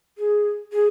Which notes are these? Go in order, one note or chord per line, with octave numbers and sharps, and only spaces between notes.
G#4
G#4